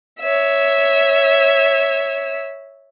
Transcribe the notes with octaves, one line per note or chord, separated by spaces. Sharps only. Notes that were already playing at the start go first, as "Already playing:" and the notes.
C#5 E5